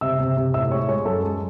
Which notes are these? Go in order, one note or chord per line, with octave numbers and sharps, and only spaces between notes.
C3 E5 E6
C3
C3
A2 E5 E6
G#3 C#5 C#6
G#3 C#5 C#6
F#2 A4 A5
G#3